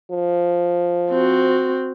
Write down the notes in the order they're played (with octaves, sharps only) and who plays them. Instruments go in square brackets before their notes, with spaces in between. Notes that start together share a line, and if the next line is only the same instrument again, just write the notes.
[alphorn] F3
[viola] C4 F#4